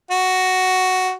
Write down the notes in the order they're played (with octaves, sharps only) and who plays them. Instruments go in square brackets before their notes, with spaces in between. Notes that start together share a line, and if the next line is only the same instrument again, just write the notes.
[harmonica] F#4